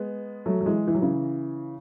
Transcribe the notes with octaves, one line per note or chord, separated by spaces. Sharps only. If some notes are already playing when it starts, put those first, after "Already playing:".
Already playing: G#3 B3
F#3 A3
F#3
E3 G#3
E3
F#3
C#3 E3